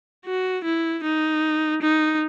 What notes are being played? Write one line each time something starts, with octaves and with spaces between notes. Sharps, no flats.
F#4
E4
D#4
D#4